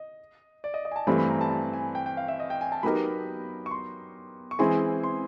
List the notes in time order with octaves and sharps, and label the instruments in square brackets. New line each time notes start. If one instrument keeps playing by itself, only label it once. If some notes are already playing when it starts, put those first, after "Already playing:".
Already playing: [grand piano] D#5
D5
D#5
D#5
G#5
A5
[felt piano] G2 E3 A3 C4 E4 [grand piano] B5
[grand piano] B5
A#5
A5
A5
G#5
G5
G5
F5
E5
D#5
G5
G#5
A5
[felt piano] F#3 B3 D#4 G4 A#4 [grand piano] B5
[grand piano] C#6
C6
C#6
[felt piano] E3 G#3 C4 E4 G#4 [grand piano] C6
[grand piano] C6